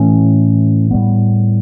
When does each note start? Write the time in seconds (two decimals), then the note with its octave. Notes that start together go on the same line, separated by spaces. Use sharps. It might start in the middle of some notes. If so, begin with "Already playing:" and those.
Already playing: A2 E3 A3 C#4
0.91 A2 G3 B3